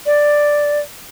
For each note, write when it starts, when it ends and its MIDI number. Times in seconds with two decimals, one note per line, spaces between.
0.06 0.80 74